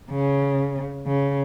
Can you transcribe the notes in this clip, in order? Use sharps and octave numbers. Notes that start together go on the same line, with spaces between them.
C#3
C#3